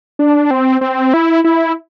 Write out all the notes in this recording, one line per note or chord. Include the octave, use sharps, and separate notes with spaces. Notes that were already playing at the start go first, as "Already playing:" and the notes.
D4
C4
C4
E4
E4